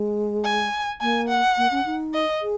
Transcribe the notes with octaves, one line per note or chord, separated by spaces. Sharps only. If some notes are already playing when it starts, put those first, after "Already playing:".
Already playing: G#3
G#5
A#3 G#5
F#5
A#3
C#4
D#4
D#5
G#4